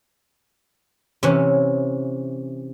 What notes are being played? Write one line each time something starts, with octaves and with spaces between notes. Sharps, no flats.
C3 E3 C#4